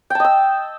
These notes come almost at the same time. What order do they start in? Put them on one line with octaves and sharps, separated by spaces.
G5 A5 D#5 E6